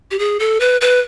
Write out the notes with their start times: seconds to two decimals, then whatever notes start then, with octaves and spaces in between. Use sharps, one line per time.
0.11 G4
0.19 G#4
0.40 A4
0.60 B4
0.81 B4